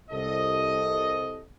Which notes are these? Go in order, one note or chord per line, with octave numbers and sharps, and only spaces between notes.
C2 A4 D#5